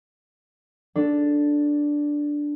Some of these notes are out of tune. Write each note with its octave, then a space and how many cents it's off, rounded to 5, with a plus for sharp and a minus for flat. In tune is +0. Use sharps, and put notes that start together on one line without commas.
D4 +0 A4 +0